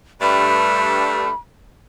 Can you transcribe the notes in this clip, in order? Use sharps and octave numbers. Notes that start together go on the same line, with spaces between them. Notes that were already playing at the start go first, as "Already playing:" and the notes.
G2 G3 A3 B5